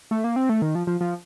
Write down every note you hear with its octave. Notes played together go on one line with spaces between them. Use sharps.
A3
A#3
C4
A3
D#3
F3
F3
F3